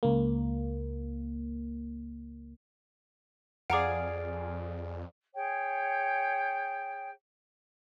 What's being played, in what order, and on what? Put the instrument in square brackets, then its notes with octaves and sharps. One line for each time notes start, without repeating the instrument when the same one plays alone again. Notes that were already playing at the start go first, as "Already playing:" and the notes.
[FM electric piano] C#2 A#3
[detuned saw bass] F2 [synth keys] G#4 F5 [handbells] D5 D7 [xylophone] F#5 A#5 D6
[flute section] G#4 C#5 G5